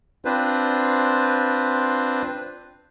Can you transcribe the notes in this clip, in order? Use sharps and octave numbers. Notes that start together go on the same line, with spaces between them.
C4 D4 F4 B4 C5